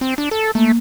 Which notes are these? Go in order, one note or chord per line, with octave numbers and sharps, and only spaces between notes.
C4
D4
A4
A3 A#3